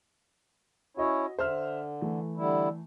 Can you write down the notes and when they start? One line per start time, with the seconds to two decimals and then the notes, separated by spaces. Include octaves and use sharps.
0.97 C#4 E4 F#4 C#5 D#5
1.39 D3 C5 E5 F6
2.01 E3 A3
2.37 D3 G3 E4